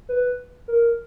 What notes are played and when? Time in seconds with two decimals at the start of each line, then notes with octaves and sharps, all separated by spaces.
0.09 B4
0.68 A#4